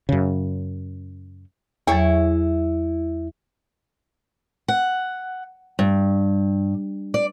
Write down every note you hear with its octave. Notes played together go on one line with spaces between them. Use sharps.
F#2 C#3
E2 F#3 E4 G#4 C#5
F#5
G2
D5